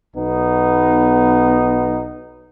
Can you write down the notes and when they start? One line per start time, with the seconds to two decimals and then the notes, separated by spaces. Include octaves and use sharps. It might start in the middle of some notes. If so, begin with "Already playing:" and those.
0.16 B1 B3 D#4